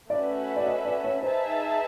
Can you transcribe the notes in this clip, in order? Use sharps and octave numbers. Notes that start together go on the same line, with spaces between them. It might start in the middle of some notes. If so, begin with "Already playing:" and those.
A3 C#4 F#4 B4 D5 E5
D5
D#5
D5
C#5
D#4 G#4 B4 C5 E5 A5